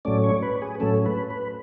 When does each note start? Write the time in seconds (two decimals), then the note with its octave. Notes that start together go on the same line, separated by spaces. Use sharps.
0.05 A2 F#3 A3 C#4 D5
0.24 C#5
0.42 B4
0.62 G#4
0.80 A2 F#3 A3 C#4 A4
1.06 B4
1.30 B4